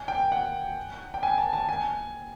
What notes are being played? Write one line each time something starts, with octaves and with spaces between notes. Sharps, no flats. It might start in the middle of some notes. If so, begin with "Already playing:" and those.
Already playing: G#5
G5
F#5
G5
G#5
A5
A5
G#5